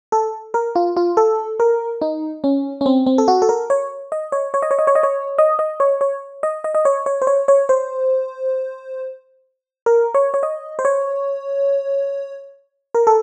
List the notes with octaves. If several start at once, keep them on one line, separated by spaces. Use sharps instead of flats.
A4
A#4
F4
F4
A4
A#4
D#4
C#4
C#4
C4
C4
A4
F#4
A4
A#4
C#5
D#5
C#5
C#5
D#5
C#5
D#5
C#5
D#5
C#5
D#5
D#5
C#5
C#5
D#5
D#5
D#5
C#5
C#5
C5
C#5
C#5
C5
A#4
C#5
C#5
D#5
C5
C#5
A#4
A4